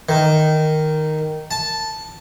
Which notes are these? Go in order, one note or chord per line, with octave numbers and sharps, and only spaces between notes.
D#3
A5